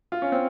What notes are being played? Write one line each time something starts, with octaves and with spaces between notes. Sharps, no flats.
F4
C#4
C4